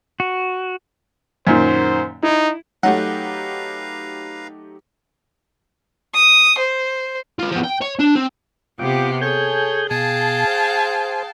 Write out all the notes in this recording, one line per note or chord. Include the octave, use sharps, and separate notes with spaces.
F#4
F#2 A#2 D#3 C5
D#4 E4
F#3 A3 D#4 G4 B4 F5 F#5 A#5
D#6
C5
F4 B4
F3 B3
G5
C#5
D4
C4
C3 B3 F4 G4 G5 D6
G#4 A4 C#5 G#5 G6
B2 G#4 F5 G5 A5
C5